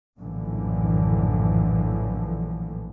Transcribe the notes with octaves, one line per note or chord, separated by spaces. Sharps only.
A#1 F#2 A2 D3 E3 F3